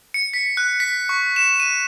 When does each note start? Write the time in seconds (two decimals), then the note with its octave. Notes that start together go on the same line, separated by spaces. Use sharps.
0.14 C#7
0.34 B6
0.57 F#6
0.80 B6
1.09 C#6
1.36 E7
1.60 D#7